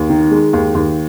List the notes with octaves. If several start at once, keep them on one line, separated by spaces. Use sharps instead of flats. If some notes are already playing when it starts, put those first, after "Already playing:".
Already playing: D#2
D#3
G#3
D#2
D#2